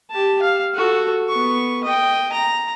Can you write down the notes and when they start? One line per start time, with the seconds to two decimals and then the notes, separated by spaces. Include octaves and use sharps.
0.11 G4 A5
0.42 F5
0.75 F#4 A4
1.29 B3 C#6
1.84 D#5 G5
2.33 A#5